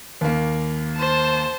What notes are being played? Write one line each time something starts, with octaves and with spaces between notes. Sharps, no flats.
D#2 A#3
C5 A5